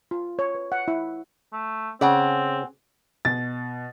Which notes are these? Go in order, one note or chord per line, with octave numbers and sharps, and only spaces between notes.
F4
C#5
B4
F#5
E4
A3
C#3 C4 D5 F#5 G#5
B2 A6